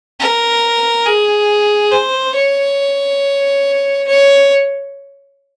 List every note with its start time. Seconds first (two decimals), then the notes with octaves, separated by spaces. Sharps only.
0.20 A#4
1.06 G#4
1.92 C5
2.35 C#5
4.08 C#5